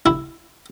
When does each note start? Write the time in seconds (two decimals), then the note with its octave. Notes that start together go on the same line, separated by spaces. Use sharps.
0.06 E4